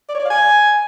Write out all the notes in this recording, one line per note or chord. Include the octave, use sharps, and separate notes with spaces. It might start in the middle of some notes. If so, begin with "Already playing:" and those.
D5
C#5
D5
F5
G#5